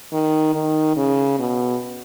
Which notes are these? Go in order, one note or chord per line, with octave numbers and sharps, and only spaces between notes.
D#3
D#3
C#3
B2